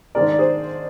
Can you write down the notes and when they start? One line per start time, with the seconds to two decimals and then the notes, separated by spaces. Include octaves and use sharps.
0.15 G#2 D#3 G#3 D4 A#4 D5
0.29 D5
0.39 G#4 C5